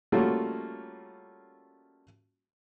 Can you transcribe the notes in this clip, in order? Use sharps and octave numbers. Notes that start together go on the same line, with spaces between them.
G3 A3 A#3 C#4 F4 F#4